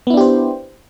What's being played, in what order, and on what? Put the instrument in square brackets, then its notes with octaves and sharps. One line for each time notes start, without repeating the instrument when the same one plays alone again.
[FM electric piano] B3
E4
D4
G4
C5